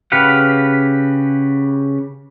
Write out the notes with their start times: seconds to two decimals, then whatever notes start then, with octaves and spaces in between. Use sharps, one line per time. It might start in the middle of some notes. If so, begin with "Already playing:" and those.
0.12 C#3 G4 B4 F5 F#5